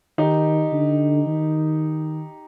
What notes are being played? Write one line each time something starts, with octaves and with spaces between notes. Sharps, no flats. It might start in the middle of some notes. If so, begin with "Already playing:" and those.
D#3 D#4 G4
D3
D#3